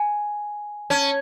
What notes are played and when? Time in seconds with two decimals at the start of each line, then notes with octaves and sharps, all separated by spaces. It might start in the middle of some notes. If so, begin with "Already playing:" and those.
Already playing: G#5
0.90 C#4 A5